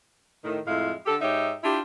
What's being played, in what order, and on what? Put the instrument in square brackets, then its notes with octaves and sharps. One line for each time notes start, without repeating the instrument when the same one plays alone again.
[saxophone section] A2 D#3
F2 A2 G#3 E4 F5
D3 G4 A4
G#2 D#4 G4 C#5 E5
D4 E4 F4 G4